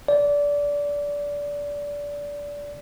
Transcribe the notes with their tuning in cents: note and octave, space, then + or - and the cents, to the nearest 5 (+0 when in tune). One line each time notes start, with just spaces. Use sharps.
D5 -20